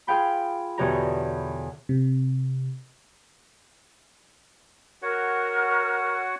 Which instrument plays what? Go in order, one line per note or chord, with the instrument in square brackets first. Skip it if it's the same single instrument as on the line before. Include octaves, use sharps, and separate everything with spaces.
[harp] F4 G#4 F5 G5 B5
E2 B2 D3 G4 C#5 A#5
[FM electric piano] C3
[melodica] F#4 C#5 F#5 [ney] A#4